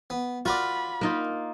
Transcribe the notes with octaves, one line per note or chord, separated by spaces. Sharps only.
B3
F4 F#4 A#4 D5 B5
A#3 D#4 F4